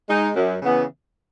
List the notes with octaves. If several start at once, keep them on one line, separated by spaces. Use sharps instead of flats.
G#3 D#4
F#2
C#3 E3 B3